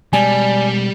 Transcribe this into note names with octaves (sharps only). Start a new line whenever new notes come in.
B2 G3 G#3 D5 G#5 A5